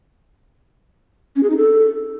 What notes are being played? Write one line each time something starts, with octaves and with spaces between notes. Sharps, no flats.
C#4
G#4
D#4
A4